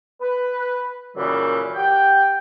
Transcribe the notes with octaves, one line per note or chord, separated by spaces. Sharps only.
B4
F#2 A#2 C#3 E3 G3
G4 F#5 G5